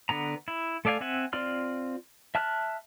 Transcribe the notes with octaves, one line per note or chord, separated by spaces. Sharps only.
D3 B3 A#5
E4
A3 A4 D5 F5 G#5
C4 E5 F#5 G#5
C4 F4 D5 C6 F6
E5 A5 F6 F#6